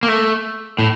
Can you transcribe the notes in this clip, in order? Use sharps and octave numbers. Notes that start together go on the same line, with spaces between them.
A#3
A3
A2